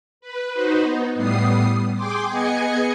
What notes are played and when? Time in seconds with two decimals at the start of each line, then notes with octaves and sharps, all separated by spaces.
0.21 B4
0.53 D#4 F#4 B4 C5
0.83 B3 D#4
1.15 A2 G3 B3 D#6 C7
1.94 G#4 G5 C6 D6
2.29 B3 G#4 D#5 G#5 C#7